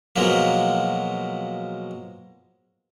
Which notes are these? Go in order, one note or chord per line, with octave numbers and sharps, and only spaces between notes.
B2 F3 F#3 G#3 A#3